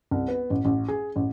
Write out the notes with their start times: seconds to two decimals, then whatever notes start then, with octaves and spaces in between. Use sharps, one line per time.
0.11 C2
0.28 B3
0.50 A1
0.65 A1
0.88 G#4
1.16 A1